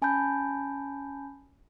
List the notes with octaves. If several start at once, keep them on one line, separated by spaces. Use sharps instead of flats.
C#4 G#5 A5 B5 G6